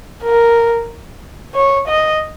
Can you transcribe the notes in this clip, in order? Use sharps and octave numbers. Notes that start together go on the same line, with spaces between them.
A#4
C#5
D#5